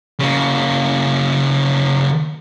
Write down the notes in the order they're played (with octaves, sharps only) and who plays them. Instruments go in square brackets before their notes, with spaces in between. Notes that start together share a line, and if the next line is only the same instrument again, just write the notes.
[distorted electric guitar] C#3 A#3